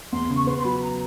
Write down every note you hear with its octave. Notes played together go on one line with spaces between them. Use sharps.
E2 C6
C#3
C#6
B3 C6
C6
F#3 B5
A#5